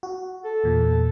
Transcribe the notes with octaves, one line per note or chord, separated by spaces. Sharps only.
F#4
A4
E2 A#2